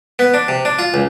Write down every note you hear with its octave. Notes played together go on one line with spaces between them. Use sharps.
B3
D4
C3
D4
F4
C#2